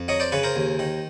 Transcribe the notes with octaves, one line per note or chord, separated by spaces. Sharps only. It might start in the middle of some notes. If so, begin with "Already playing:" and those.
Already playing: F2
F#3 C#5 D#5
C5 D5
C#3 B4 C#5
A#4 C5
D#2
D#3